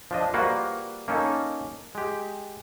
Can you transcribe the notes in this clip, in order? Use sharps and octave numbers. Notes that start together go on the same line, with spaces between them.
F3 D4 D#5
G3 A#3 F4 F#4 B4 C5
A#3 C#4 D#4 A4
G#3 G4